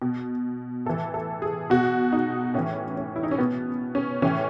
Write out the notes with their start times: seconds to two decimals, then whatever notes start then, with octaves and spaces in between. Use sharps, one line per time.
0.02 B2
0.86 A2 E3 A4
1.14 A4
1.42 G#4
1.70 B2 F#4
2.12 D#4
2.54 A2 E3 C#4
2.97 C#4
3.16 E4
3.23 D#4
3.31 C#4
3.38 B2 B3
3.95 C#4
4.22 A2 E3 C#4